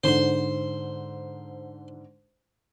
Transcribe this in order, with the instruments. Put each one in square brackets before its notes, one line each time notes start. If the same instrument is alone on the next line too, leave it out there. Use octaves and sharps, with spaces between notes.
[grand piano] G#2 D3 [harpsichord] C5 C6